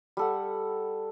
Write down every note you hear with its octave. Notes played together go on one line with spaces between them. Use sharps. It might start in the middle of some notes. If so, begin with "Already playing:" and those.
G3 A4 F#5